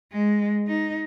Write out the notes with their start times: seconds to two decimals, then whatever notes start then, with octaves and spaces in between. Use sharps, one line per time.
0.12 G#3
0.67 D#4